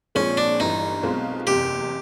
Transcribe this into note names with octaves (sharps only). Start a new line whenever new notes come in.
A#1 A#2 F3 G#3 C4 C#4
D4
G1 G2 E3 D#4
B1 B2 G#3 C4 F4
F#1 E2 C3 G4